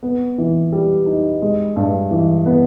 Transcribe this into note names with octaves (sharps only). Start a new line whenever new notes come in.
B3
E3
G3
D#4
G#3
G2
E3
B3